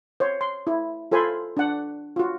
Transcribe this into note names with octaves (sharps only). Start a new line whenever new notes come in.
C5 C#5
C6
E4
F4 A4 C5 G#5 B5 C6
D4 F#5
F4 F#4